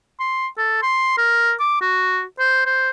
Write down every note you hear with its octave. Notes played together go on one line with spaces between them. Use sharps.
C6
A4
C6
A#4
D6
F#4
C5
C5